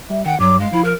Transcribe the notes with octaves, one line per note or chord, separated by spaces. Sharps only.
G3 E5
D#3 F#5 G5
G2 F#3 D6
G#3 F5
F3 E4
A#4